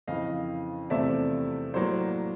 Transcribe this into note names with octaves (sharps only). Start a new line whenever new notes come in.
F2 C#3 E3 D#5 F5
E2 C3 F3 A3 C4 D5 E5
A2 F#3 A#3 C5 D5